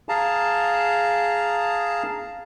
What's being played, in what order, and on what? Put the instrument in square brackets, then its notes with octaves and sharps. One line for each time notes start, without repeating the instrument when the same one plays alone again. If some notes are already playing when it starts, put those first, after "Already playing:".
[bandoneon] G#4 F5 A5 A#5